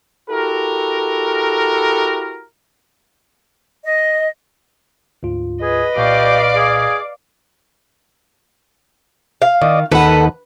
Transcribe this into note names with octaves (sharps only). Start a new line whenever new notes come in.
E4 F#4 G4 A4 A#4
D#5
D2 G#2 F4
G#4 B4 D#5
C2 A#2 G4 D5 F5 C#6 D6
G#4
F5
D#3 D5 D#5
D#2 D#3 A4 B4 F#5